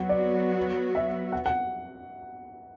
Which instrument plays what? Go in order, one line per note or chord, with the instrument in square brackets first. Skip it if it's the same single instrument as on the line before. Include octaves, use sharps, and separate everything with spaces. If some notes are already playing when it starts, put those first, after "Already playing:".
Already playing: [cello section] F#3 B3 F#4 [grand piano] F#5
[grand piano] D5
E5
F#5
F#5